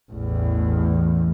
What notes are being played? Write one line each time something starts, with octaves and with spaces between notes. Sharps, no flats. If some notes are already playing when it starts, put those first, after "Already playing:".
A1 E2